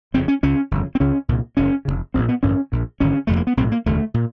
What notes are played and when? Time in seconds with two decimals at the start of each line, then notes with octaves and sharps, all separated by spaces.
0.14 G1 F2 C#3 C4
0.28 C#4
0.43 C#2 C#3 C#4
0.71 G1 F2 C#3
0.95 C4
1.00 C#2 C#3 C#4
1.28 C2 A#2
1.57 F#1 E2 C#3 C#4
1.85 F1 E2 C#3
2.14 A#1 A#2 C4
2.29 B3
2.43 A1 G2 D3 C#4
2.72 A#1 A#2
3.00 G#1 G2 D3 C#4
3.27 F1 F2 D3 A3
3.36 A#3
3.47 B3
3.57 B1 C4
3.60 A2
3.72 A#3
3.86 E1 D#2 D3 A3
4.14 A#2